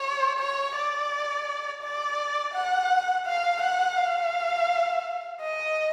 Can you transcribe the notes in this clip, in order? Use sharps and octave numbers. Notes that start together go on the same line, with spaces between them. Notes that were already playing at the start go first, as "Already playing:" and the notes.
Already playing: C#5
C#5
D5
D5
F#5
F5
F#5
F5
D#5